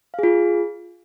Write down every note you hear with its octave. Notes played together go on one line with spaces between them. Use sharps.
F4 G#4 F5